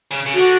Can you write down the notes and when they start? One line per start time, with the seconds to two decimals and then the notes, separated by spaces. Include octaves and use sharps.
0.11 C#3
0.26 C#3
0.34 D3 F#4